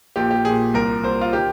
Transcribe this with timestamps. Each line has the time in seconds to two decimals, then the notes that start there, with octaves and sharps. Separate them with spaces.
0.16 A#1 A#2 G4
0.31 G4
0.45 A#1 A#2 G#4
0.74 C2 A#2 A#4
1.03 C2 A#2 C5
1.21 F4
1.33 D#3 G4